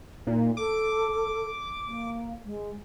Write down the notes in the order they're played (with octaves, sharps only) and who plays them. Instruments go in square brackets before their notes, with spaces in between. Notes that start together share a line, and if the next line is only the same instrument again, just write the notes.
[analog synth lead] A#2 [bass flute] D#4
[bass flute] A4 [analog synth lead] D6
[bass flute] A#3
G#3